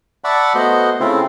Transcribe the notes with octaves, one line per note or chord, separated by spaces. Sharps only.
D5 E5 F#5 A5 B5 C#6
A3 B3 F#4 C5 D#5
C#3 A3 C4 E4 F4